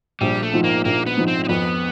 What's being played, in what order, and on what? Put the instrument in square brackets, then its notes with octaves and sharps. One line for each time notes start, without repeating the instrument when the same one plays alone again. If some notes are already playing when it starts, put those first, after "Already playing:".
[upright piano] A#1 [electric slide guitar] G3
[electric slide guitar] A3
[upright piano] G#2 F3
[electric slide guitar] A#3
[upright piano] A#1 [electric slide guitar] A#3
[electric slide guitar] B3
[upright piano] G#2 F3
[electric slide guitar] C4
C4
[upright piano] F2 [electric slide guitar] B3